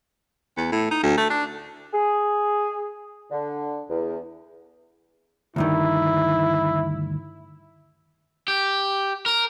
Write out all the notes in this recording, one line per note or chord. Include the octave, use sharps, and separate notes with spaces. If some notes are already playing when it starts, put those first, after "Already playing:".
E2
A2
D#4
D2
A3
D4
G#4
D3
E2
D2 G2 D#3 E4
G4
A#4